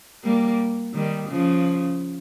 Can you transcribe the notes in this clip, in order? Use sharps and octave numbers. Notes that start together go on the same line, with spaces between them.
G3 A#3
D#3 G3
C#3 F3